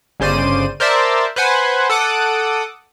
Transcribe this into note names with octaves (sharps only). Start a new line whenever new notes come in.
G1 C#3 C5 D5 D#7
A#4 C5 D5 E5 A5
B4 C5 F#5 G#5
A4 F#5 D6 D#6